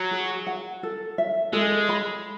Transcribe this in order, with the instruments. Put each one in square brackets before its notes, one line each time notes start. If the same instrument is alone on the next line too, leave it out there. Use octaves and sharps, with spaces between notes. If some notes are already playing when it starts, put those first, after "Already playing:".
Already playing: [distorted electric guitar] F#3
[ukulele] G#4
F#5
A4
E5
[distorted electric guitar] G#3 [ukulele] A4
[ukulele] B5